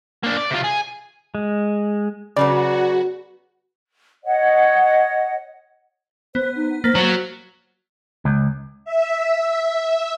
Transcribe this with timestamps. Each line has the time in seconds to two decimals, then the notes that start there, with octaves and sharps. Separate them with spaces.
0.23 A#3 D4
0.37 D5
0.50 C3 F4
0.64 G#4
1.35 G#3
2.37 C#3 F#3 B3 F#4 D5
4.24 C#5 D#5 F#5
6.35 B3 C5
6.56 D#4
6.84 A#3 C5 A6 B6
6.95 F#3
8.25 C#2
8.85 E5